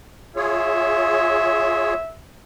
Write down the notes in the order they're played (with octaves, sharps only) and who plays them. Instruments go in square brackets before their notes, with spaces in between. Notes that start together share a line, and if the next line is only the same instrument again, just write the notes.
[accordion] F4 G#4 C#5 [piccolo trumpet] E5